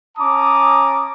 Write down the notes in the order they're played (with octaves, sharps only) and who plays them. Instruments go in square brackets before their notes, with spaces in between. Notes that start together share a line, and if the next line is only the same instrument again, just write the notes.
[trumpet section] C#4 A5 A#5 D6 D#6